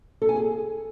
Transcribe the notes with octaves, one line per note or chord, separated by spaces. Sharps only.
A4
G#5
G#4